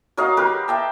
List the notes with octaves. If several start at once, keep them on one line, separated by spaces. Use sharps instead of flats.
F#3 A#4 D#5 F5
G4 A#4 B4
E5 G5 A5